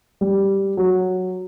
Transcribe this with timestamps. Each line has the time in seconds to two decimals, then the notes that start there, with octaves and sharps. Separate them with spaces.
0.21 G3
0.77 F#3